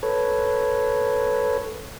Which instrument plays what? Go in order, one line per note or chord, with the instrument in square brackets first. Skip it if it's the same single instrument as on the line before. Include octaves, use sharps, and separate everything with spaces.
[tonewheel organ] A4 B4 C#5